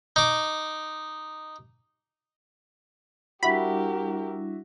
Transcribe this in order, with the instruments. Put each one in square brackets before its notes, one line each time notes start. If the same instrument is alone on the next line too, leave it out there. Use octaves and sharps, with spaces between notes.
[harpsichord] D#4 D6
[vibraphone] G3 D4 E4 [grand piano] F#4 E5 [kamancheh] G4 A#4 [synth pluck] B5